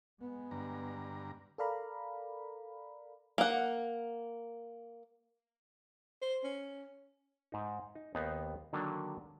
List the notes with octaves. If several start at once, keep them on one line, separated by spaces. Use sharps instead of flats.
G#3 B3
G2 D3 A#5
A4 A#4 D5 F5 A#5 B5
A#3 F#5
C5
C#4
G#2 D#4
D#4
D#2 B3 D#4 C5
D3 D#3 F#3 A#3 D4